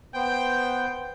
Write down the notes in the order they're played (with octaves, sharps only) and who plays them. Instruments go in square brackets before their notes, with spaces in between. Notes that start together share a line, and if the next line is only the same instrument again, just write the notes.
[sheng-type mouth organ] B3 C5 [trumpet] G5